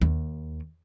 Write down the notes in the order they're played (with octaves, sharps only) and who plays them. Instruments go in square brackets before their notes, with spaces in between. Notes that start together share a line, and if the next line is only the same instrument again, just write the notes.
[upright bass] D#2